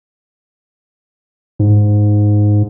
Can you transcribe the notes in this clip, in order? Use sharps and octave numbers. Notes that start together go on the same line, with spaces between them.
G#2